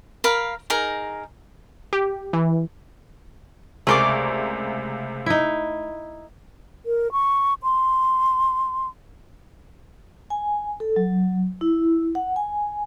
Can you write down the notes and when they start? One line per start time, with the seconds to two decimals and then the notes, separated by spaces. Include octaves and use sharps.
0.24 A#4 F5 B5
0.70 D#4 G#4 A#4 A#5
1.93 G4
2.33 E3
3.87 C#2 C3 A3 G#4 A#4 D5 C6 D6
5.26 D#4 E4
6.86 A#4
7.12 C#6
7.63 C6
10.30 G#5
10.80 A4
10.96 F#3
11.61 E4
12.15 F#5
12.36 G#5